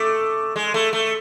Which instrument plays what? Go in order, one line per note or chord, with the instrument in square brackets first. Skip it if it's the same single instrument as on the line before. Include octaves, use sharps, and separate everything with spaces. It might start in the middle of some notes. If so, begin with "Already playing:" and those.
Already playing: [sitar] A3 [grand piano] D6
[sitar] G#3
A3
A3